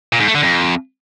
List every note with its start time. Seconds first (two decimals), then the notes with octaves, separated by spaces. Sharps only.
0.13 A#2
0.20 G#2
0.27 A3
0.35 D3
0.42 F2